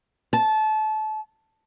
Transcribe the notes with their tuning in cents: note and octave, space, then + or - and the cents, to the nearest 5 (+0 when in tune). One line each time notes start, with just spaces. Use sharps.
A5 -25